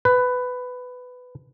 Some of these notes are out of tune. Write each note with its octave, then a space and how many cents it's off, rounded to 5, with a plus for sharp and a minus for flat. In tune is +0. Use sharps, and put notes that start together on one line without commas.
B4 +15